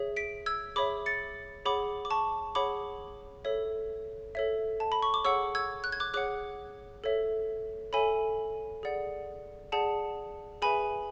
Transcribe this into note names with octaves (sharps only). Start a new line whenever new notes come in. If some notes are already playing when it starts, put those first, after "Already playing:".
Already playing: G#4 C#5 E5
B6 D7
E6 G#6
G#4 C#5 E5 B5 D6
A6 C#7
G#4 C#5 F#5 B5 D6
D6
A5 C#6
G#4 C#5 F#5 B5 D6
A4 C#5 E5
A4 C#5 E5
A5
B5
C#6
D6
G#4 C#5 F#5 C#6 E6
E6 G#6
F#6
G#6
D6 F#6
G#4 C#5 F#5 D6 F#6
A4 C#5 E5
A4 C#5 E5 G#5 B5
G#4 D5 F#5
G#4 D5 F#5 A5
G#4 B4 E5 G#5 B5